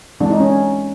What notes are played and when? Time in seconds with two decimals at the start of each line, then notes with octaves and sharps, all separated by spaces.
0.20 E3 G#3 C4 D4
0.30 D#4
0.40 C#4